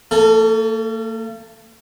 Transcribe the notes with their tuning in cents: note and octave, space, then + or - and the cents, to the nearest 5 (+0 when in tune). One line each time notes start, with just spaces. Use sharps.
A#3 -45 A4 +0